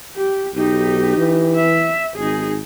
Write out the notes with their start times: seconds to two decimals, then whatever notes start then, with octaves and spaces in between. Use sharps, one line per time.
0.16 G4
0.55 B1 D#4 G4
1.17 E3
1.55 E5
2.16 G#1 D#4 G#4